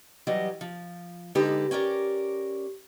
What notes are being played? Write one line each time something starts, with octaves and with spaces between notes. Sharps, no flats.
E3 F#3 G3 D#5
F3
D3 G#3 D#4 G4 B4
C#4 G4 A#4 D5